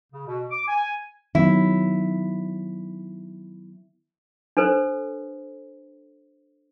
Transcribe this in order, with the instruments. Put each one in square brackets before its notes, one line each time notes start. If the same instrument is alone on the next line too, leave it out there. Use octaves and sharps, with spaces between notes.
[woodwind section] C#3
B2
D6
G#5
[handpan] D#3 F#3 B3 [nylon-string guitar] E4
[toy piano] D4 A4 B4 C5